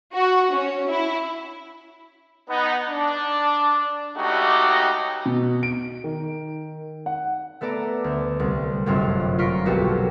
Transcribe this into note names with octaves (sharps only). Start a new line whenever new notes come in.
F#4
C#4
E4
B3 D#4
D4
C#2 C#3 A3 D#4 F#4 G4
B2
D7
D#3
F#5
A3 B3 A4 D5 A#5
D2
C2
G1 F#2 C3 D4 F4
A#3 F4 A#4 C#6 B6 D7
F1 B1 F#4 G4 A4